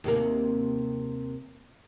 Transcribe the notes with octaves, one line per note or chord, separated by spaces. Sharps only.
D#2 C3 A#3